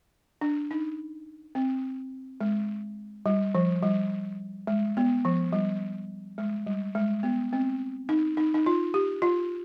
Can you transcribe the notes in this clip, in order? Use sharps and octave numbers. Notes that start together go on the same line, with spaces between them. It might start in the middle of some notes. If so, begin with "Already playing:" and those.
D4
D#4
C4
G#3
G3
F3
G3
G#3
B3
F3
G3
G#3
G3
G#3
B3
C4
D#4
D#4
D#4
F4
G4
F4